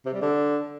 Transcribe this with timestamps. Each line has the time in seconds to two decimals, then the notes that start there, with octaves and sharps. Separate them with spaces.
0.05 C3
0.13 G3
0.22 D3